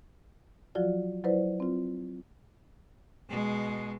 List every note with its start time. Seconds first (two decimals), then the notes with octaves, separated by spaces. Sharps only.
0.75 F3 F#3 F4 F#4 D5
1.24 F#3 E4 B4 C5 D5
1.60 C4 F4
3.29 B2 G#3